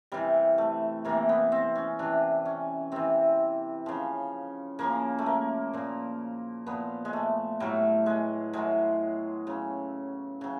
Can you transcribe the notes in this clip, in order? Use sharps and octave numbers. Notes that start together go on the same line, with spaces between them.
C3 E3 G3
A3
C3 E3 A#3
B3
C4
C#4
C3 E3 D4
C#4
C3 E3 C4
C#3 F3
C#3 F3 A#3
A3
A#3
A#2 F3
A#2 F3 B3
G#3
A3
A2 F#3 G3
G#3
A2 F#3 G#3
C#3 F#3
C#3 F#3